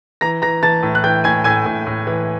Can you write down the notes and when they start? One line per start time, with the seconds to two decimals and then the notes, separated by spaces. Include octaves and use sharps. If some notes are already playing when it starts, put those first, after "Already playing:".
0.21 E3 A#5 A#6
0.42 E3 A#5 A#6
0.63 E3 A5 A6
0.83 A2
0.95 F#6
1.04 E3 G5 G6
1.24 A2 G#5 G#6
1.44 A2 G#5 G#6
1.66 A2
1.87 A2
2.07 E3